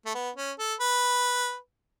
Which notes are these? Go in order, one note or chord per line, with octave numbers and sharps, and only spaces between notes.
A3
B3
C#4
A4
B4